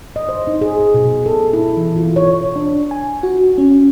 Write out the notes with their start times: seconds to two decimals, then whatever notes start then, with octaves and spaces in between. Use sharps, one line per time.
0.16 D#5
0.29 C5
0.47 D#4
0.61 G#4
0.94 B2
1.26 A4
1.53 E4
1.77 E3
1.96 F4
2.16 C#5
2.56 D4
2.91 G#5
3.23 F#4
3.58 C#4